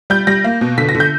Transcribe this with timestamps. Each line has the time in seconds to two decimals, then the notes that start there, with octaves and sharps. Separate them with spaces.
0.10 G3 G6
0.27 G3 A#6
0.44 A#3
0.61 B2
0.78 D3 B6
0.89 A#6
0.95 D3
1.00 G6